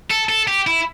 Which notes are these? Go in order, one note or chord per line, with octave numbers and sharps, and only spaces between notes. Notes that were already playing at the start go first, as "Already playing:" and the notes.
A4
A4
G4
E4